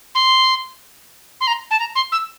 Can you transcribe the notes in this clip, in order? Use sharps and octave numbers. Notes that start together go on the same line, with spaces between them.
C6
C6
A#5
A5
A#5
C6
E6